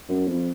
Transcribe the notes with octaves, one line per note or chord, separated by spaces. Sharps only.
F#2
F2